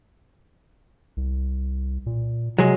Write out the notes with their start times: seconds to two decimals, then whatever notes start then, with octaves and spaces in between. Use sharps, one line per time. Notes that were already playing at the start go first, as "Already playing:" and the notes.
1.17 C2
2.06 A#2
2.58 C3 F#3 G#3